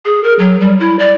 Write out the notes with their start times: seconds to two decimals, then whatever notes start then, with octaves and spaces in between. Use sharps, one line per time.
0.05 G#4
0.24 A#4
0.39 F#3
0.60 G3
0.80 E4
0.99 D5